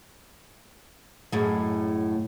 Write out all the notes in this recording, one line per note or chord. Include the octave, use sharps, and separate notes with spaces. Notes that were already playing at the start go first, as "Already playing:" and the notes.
F#2 A2 G#3